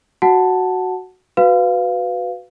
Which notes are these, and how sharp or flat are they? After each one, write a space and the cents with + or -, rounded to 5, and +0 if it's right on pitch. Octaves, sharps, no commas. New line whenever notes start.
F#4 +0 F#5 +0 A5 +0
F#4 +0 B4 +15 F5 +0